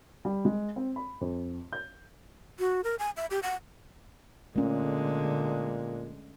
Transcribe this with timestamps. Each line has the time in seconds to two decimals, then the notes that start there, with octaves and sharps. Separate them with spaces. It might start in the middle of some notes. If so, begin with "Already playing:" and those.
0.25 G3
0.45 G#3
0.76 C4
0.96 B5
1.21 F2
1.73 G6
2.59 F#4
2.84 A#4
2.99 G#5
3.17 E5
3.31 G4
3.43 F#5
4.56 A#2 D3 G#3 A3 C#4